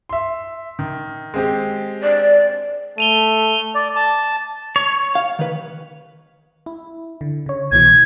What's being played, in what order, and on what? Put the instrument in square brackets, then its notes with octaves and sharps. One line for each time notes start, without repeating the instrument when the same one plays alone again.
[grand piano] E5 C6
D#3
G#3 C4 G4
[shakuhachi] D5
[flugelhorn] A3 [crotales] D#7 F7 G7
[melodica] D5
A5
[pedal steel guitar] C#5
[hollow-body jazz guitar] F5
D#3 B4
[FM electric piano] E4
D3
C#3 C#5
[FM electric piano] C2 B2 E3 [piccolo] G#6